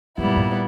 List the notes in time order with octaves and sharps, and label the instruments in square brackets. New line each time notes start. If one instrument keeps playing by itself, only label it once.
[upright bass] F#2 [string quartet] A#2 G3 B3 E4
[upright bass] G2